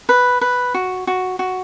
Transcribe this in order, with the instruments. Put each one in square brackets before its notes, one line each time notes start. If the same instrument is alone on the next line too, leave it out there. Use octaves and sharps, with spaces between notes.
[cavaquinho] B4
B4
F#4
F#4
F#4